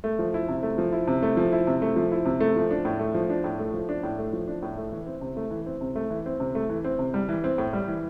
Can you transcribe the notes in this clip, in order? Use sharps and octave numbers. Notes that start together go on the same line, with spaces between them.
A3
F3
E4
C3
A3
F3
E4
C3
A3
F3
E4
C3
A3
F3
E4
C3
A3
F3
D4
A2
A3
F3
D4
A2
A3
F3
D4
A2
A3
F3
D4
A2
A3
E3
C4
C3
A3
E3
C4
C3
A3
E3
C4
C3
A3
E3
C4
C3
G3
E3
C4
A2
G3
E3